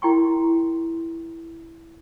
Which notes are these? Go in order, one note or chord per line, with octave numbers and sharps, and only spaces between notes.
E4 A#4 G5 C6 C#6